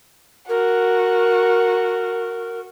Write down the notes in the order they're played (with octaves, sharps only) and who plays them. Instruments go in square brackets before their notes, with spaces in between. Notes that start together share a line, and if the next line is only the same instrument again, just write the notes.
[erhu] F#4 [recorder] A#4